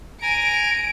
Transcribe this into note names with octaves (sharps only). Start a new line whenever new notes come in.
G#5 A#5 D7